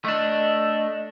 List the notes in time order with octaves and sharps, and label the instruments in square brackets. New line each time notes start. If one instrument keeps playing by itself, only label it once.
[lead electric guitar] A3 D4 [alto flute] D#5